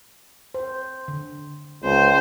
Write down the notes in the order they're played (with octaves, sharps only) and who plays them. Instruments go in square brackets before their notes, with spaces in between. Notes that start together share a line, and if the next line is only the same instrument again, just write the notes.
[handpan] C5
D3
[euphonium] C#2 [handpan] C#4 [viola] C5